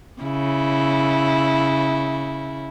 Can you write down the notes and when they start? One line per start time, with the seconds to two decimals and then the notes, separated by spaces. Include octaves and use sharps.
0.22 C#3 E4